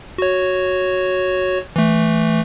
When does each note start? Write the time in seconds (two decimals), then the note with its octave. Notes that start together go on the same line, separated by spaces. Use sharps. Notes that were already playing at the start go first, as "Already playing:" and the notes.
0.18 F#4 C#5
1.76 E3 A3